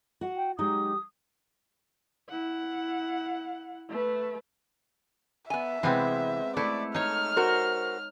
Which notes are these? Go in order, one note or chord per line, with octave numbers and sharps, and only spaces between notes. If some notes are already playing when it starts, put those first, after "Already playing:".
F#4 F#5
G5
F#3 G#3 D#4 G4 D#6
E4 F#5
A3 B4
B3 E5 G#5
C3 E3 G#3 B3 C4
A3 E4 D5
D#4 C#5 F6
F#4 A#4 C5